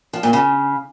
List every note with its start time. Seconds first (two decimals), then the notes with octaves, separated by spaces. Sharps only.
0.13 F3
0.23 A#2
0.33 C#3